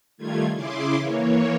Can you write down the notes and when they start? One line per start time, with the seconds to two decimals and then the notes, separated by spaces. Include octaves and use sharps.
0.17 D#3 G3 A3 F4 G#6
0.52 C#3 E4 G#4 C6 D6
0.95 E3 A#3 C#5